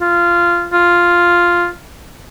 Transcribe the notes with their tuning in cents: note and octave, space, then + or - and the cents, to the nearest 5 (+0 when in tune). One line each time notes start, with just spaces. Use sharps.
F4 -15
F4 +0